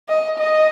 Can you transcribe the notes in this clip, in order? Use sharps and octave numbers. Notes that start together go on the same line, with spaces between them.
D#5
D#5